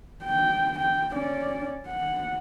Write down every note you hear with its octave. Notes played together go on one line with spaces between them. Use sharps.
G5
G5
C#4 D5
F#5